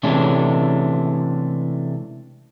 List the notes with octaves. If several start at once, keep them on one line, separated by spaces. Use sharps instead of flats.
C3 E3 G#3 A3 C#4 D4